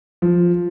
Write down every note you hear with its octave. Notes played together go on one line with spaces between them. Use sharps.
F3